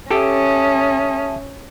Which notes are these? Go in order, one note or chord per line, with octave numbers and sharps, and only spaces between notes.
C#4 G4 A4 E5 A5 D#6